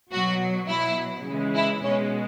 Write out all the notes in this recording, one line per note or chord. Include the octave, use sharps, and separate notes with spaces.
B2 F#3 F#4
B2 F#3 E4
C#3 E3 G#3
E4
B2 G#3 C#4